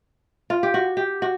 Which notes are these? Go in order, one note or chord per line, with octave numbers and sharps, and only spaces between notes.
F4
G4
F#4
G4
F#4